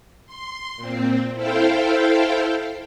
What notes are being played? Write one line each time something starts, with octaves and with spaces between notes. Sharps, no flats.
C6
A#2 C4
E4 A4 C5 F5 G5